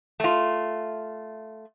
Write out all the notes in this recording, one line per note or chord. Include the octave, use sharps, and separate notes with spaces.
A3 F4